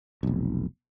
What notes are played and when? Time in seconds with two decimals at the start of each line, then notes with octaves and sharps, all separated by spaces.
0.23 F1 B1